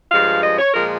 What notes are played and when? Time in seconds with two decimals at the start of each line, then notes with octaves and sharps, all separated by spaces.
0.12 G2 F3 G#3 F5
0.43 D#5
0.59 C#5
0.73 A#2 F3 G#3 A#4